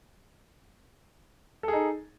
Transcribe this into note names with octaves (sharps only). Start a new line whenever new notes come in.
D#4 G#4 A4